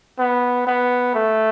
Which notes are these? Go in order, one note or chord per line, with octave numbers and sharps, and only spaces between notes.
B3
B3
A3